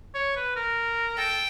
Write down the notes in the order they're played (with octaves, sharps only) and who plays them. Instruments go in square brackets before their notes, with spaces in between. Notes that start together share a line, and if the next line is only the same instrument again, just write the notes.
[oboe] C#5
B4
A#4
[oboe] A4 [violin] G5